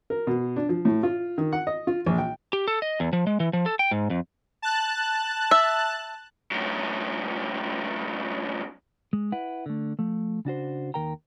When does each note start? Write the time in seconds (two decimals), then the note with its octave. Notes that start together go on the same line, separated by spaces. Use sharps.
0.10 A#4
0.27 B2
0.56 D4
0.69 F3
0.85 A2
1.03 F4
1.38 D#3
1.52 F#5
1.67 D#5
1.87 F4
2.06 A#1
2.18 G5
2.53 G4
2.68 A4
2.82 D#5
3.00 E2
3.13 F3
3.27 G#3
3.40 E3
3.53 F3
3.66 A4
3.79 G5
3.91 G#2
4.10 F2
4.62 A5 F#6
5.51 E5
6.51 F#2 A2
9.13 G#3
9.32 E4 B4 F#5
9.66 D3 A3
9.99 F3 A3
10.45 C#3 D4 F#4 C5
10.94 D#2 D#3 A#4 G5 A#5